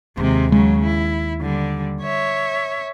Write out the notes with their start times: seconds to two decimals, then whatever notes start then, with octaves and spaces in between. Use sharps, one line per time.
0.17 D#2 C3 G#3
0.52 C#3 F#3 G#3
0.85 E4
1.41 D3 G3
2.02 C#5 E5